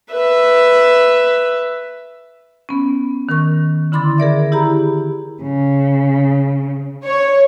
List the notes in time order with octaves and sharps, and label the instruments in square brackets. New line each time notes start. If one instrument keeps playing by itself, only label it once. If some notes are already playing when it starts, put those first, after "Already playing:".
[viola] B4 E5
[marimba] B3 C#4
D#3 A#4 C#6
D3 E4 B5 C6 D6 A6
G#4 A#4 D5 E5
E4 G4 G#4 A#5 B5
[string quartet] C#3
[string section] C#5